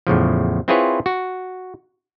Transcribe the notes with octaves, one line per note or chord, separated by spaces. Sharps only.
E2 A2 C#3 F3
C4 E4 F4 G#4 B4 C#5
F#4